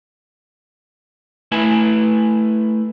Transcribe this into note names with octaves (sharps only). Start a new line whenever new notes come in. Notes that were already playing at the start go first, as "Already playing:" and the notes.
A3 E4 B4 G#5